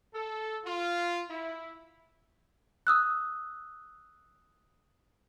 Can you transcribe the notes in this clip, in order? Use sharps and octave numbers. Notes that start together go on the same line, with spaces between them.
A4
F4
E4
D#6 E6 F#6